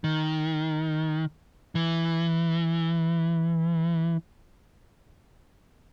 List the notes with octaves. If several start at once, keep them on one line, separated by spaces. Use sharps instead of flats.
D#3
E3